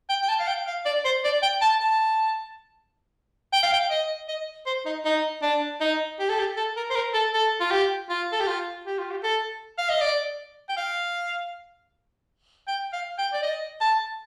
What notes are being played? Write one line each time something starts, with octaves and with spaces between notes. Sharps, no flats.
G5
G5
A5
F5
G5
F5
D5
C5
D5
G5
A5
A5
G5
F5
G5
D#5
D#5
C5
D#4
D#4
D4
D#4
G4
A4
G4
A4
A#4
C5
A#4
A4
A4
F4
G4
F4
A4
G4
F4
G4
F4
G4
A4
F5
D#5
D5
G5
F5
G5
F5
G5
D5
D#5
A5